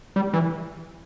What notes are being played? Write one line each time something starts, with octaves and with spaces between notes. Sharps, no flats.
G3
E3